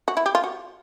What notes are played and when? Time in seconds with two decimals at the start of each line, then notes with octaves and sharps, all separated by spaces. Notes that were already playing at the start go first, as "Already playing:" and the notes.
0.08 F#4
0.17 E4
0.26 G4
0.35 F4
0.44 F#4